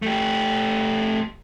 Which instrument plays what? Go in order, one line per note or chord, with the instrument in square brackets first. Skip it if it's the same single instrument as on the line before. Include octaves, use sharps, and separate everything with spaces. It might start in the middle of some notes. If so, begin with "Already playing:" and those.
[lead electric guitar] A3 G4